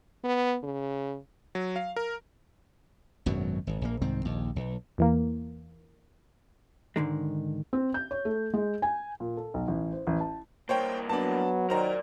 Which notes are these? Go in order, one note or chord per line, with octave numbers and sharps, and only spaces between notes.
B3
C#3
F#3
F5
A#4
G#1 F#2 B2 F#3
G#1
A#1 A#3
C2 G#2 D#3 C4
A#1 D#2
B1
E2 E3 A#3
G#2 D3 D#3 G#3
C4
G6
C#5
A3
G#3
G#5
A#2
A4
B1
A1
C5
A1
A5
G2 A#3 C5 C#5 G5
F#3 B3 D4 A5
D#3 A#4 C5 D5 A#5